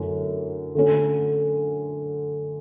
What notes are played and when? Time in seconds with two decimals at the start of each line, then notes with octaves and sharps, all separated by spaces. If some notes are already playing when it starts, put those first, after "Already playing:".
Already playing: F#2 D3 A3 E4
0.75 D3 A3 C#4